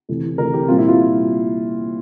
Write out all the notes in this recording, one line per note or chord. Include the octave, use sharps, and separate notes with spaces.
C3 E3 A3
C3 E3 A3 A#4
G4
A#2 G3 C4 F4
E4
F4